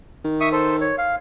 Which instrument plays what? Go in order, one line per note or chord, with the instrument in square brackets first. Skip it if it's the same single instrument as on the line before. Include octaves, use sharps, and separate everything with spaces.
[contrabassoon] D#3
[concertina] E5 C#6 D#6
A4 C5
C#5
F5